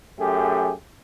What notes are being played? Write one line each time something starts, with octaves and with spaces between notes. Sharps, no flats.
F#2 A3 G4 G#4